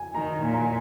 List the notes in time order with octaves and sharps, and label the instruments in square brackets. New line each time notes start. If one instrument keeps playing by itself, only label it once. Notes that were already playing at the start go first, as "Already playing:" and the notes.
Already playing: [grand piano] G#5
[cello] D#3 [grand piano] A#5
[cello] A#2 [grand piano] G#5
[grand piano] A#5
G#5